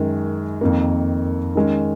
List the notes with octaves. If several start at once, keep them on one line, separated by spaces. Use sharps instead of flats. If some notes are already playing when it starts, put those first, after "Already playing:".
Already playing: F#2 D#3 G#3
F2 D#3 A#3
D#3 G#3 C#4